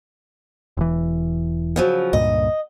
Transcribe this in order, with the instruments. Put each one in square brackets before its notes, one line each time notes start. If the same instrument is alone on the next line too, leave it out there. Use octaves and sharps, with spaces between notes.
[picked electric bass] E1 E3
[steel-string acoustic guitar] C#3 F3 F#3
[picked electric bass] C#2 G2 A#2 [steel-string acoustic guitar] D#5